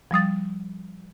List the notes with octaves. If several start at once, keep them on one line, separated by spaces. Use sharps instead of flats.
F3 G3 D#6 A6